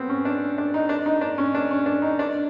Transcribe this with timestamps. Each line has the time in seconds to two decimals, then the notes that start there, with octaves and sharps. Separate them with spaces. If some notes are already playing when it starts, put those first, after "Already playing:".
Already playing: B3 C4
0.09 C#4
0.25 D4
0.58 D4
0.74 D#4
0.89 D4
1.06 D#4
1.21 D4
1.38 C#4
1.55 D4
1.71 C#4
1.86 D4
2.02 D#4
2.19 D4